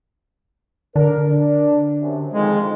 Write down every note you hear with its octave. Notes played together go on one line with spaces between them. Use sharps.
D3 D4 A#4
D4
F#2 C3
F2 D#3 G#3